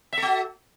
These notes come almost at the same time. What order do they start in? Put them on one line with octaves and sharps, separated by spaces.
E5 A4 F#4